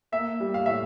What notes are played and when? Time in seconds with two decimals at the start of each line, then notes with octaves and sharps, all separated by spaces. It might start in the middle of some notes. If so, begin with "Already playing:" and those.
0.12 A#3 E5
0.40 G3
0.54 F5
0.66 A2 E5